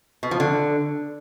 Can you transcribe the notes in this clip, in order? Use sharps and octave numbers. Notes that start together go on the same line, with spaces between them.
B2
F3
D3